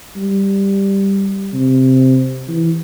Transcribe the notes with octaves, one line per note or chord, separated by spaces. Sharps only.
G3
C3
E3